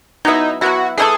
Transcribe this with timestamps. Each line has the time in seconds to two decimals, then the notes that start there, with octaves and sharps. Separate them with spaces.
0.25 F#3 B3 D#4 E4
0.61 F#3 B3 E4 F#4
0.98 E3 A3 E4 G#4 A4